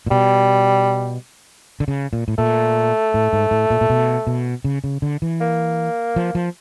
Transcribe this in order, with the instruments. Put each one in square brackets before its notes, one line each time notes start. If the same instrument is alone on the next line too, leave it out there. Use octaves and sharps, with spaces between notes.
[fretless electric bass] A#2
[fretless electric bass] B2 [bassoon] G3
[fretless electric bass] D3
C#3
A#2
A2
[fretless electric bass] A#2 [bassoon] A3
[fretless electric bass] A2
G#2
A2
A#2
A#2
B2
B2
C#3
C#3
D3
E3
[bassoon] A#3
[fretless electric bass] F3
F3